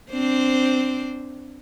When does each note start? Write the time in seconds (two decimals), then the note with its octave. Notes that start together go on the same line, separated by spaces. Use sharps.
0.12 C4 D4 C5